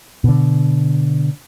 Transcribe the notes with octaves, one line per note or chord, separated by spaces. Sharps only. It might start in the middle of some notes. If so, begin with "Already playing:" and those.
B2 D3